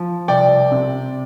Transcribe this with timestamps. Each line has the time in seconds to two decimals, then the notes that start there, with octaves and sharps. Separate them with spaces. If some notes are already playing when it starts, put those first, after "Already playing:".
Already playing: F3
0.28 C2 D5 G5
0.71 C3